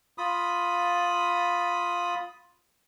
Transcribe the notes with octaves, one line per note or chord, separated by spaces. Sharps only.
F4 B5 D#6